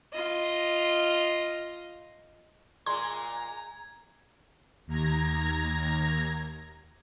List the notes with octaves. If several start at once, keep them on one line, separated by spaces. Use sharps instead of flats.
F4 D#5
A#2 G#3 A#5 C6 G#6
D#2 A#5 G#6 A#6